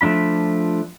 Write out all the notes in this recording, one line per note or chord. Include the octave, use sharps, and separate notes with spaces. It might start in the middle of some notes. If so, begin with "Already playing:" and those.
F3 A3 D4 F4 B5